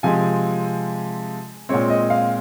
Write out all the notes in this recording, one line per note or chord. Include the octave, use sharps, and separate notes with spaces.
C3 F3 G#3 C4 G#5
A#2 G#3 C4 C#5
D#5
F5